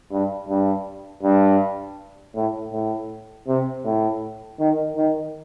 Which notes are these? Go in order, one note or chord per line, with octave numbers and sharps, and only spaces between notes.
G2
G2
G2
A2
A2
C3
A2
D#3
D#3